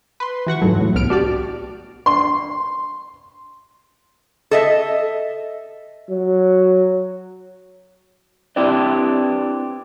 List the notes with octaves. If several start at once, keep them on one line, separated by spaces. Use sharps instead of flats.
B4 C6
E3 F#4 F#5 C#6
G#2 C#3 E3 F#3 A3
A2
C2 B3 F6 D7
D4 F#4 G4 D5
C6
A4 D#5 E5
F#3
C4 D4 E4 G4 B4 D5